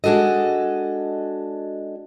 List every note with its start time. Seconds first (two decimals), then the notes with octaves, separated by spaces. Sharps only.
0.04 G#3 D4 F#4 A4 D#5